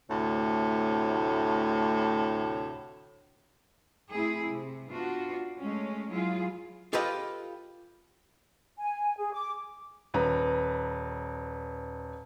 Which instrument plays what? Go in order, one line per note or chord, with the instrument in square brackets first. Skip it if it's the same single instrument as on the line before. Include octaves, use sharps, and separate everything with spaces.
[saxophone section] D2 A2 C3 C#5
[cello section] A3 C4 E4 G#4
C3
B3 D4 F4 F#4
G#3 A3 C#4
F#3 E4 F4 G#4
[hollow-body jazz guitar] F4 G4 A4 B4 D#5 F5
[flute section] G#5
G#4
D6
[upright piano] D#1 B4 A#5